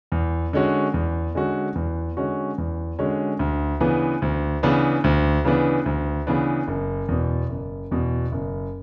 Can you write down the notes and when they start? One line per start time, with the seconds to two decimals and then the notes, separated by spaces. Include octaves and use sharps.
0.12 E2
0.53 D3 G#3 C#4 F#4
0.94 E2
1.35 D3 G#3 C#4 F#4
1.75 E2
2.17 D3 G#3 C#4 F#4
2.58 E2
2.99 D3 G#3 C#4 F#4
3.39 D2
3.80 C#3 E3 B3 D4
4.22 D2
4.63 C#3 E3 B3 D4
5.04 D2
5.45 C#3 E3 B3 D4
5.86 D2
6.27 C#3 E3 B3 D4
6.68 F#1
7.08 E2 B2
7.50 F#1
7.91 E2 B2
8.32 F#1